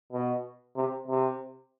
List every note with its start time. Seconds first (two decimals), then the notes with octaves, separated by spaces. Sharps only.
0.13 B2
0.76 C3
1.08 C3